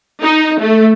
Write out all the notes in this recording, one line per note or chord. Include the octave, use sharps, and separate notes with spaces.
D#4
A3